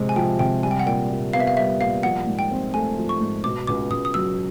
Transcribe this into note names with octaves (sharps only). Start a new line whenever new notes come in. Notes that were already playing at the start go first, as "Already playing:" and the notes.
Already playing: C3 F3 G#3 C4
G#5
F3 G5
C3 G5
G3 G#5
G5
F#5
A#2 G5
A#2
B3 F5
E5
F5
G3 E5
A#2 F5
F3 F#5
G#2
G5
C4
A3 G#5
F3
C#6
G#2
B2 D6
C#2 D6
C#2 D#6
D#6
F#3 E6